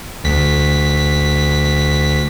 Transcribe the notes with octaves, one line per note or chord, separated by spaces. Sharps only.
D2 B6